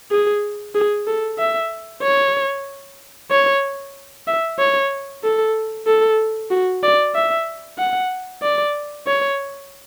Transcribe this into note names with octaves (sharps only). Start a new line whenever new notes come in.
G#4
G#4
A4
E5
C#5
C#5
E5
C#5
A4
A4
F#4
D5
E5
F#5
D5
C#5